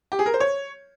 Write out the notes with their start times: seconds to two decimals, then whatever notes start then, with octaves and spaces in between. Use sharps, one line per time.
0.12 G4
0.19 G#4
0.26 A#4
0.34 C5
0.40 C#5